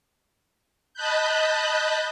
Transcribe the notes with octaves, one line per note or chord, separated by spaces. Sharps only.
D#5 A5 B5 F#6 G6